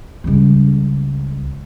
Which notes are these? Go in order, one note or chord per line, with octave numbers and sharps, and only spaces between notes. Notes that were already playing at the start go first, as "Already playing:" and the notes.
C#2 G3